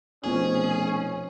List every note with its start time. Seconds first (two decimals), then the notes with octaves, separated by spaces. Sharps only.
0.24 F1 B2 F3 C4 C#4 G#4